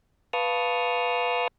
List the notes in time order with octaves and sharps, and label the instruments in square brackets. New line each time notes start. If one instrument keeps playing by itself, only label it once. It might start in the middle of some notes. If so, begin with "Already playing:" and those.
[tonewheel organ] B4 F5 A5 C#6 D#6 F6